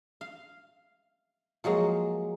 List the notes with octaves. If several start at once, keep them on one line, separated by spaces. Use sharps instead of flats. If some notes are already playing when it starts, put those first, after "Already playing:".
F5
F3 F#3 G#3 A#3